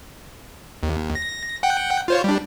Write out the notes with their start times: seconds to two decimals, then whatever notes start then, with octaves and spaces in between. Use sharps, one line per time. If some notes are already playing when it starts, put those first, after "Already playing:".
0.83 D#2
1.15 A#6
1.63 F#5 G5
2.08 F4 C5 C#5
2.24 G3 D4